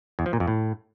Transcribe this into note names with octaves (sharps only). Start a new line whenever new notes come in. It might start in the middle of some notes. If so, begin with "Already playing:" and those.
E2
F3
A#2
F2
A2